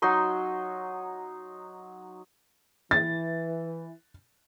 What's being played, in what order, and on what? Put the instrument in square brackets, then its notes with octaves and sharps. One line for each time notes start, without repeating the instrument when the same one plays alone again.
[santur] F#3 D#4 C6 C#6
[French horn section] E3 [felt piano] A6